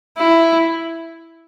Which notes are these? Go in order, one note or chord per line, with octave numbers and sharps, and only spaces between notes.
E4